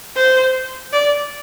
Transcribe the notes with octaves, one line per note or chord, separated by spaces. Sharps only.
C5
D5